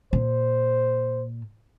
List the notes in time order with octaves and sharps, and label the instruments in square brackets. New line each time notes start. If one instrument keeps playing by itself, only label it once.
[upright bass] A#2 [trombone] C5